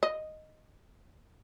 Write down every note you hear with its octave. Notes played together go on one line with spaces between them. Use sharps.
D#5